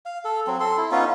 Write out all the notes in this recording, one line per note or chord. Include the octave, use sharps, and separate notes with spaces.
F5
A4
F#3 C4
A4 C6
E4
B3 C#4 D#4 F4